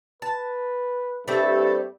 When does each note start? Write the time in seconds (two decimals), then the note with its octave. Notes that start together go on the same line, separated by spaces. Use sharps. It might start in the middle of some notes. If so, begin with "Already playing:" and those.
0.22 B4 A5
1.28 G2 G3 A3 C4 E4 A4